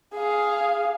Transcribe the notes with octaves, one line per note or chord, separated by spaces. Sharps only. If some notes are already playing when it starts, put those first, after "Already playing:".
G#4 F5